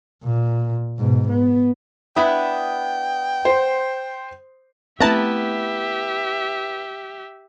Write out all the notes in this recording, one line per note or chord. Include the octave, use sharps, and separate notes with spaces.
A#2
G#2 B2
B3
B3 D4 E4 G5 D#6
C5 C6
A3 B3 C4 E4 G4 E5 A5 A#5